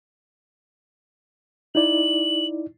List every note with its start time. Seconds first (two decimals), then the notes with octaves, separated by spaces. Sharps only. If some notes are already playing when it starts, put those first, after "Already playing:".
1.75 D#4 E4 D5 F#7